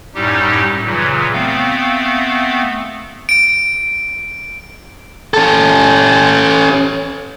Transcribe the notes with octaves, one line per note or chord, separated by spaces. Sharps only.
F#2 A2 G3 D#4 G4
A#2 C#3 E3 F#3
A3 B3 C4 F5
D7
C#4 A4